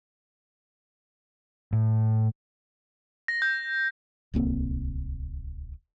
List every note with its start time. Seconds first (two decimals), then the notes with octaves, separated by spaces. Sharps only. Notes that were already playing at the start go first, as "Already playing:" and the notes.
1.73 A2
3.28 A#6
3.42 G6
4.34 D1 C2 A#3 C4